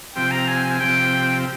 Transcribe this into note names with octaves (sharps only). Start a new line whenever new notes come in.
C3 F3 C4 G4 G5
A#5
G#5
G#5
C3 F3 C4 G4 G5